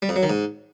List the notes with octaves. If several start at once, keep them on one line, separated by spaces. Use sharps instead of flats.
G3
F2
F#3
D#3
G#2